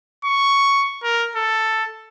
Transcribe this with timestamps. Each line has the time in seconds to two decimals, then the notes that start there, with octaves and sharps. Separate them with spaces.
0.25 C#6
1.03 A#4
1.36 A4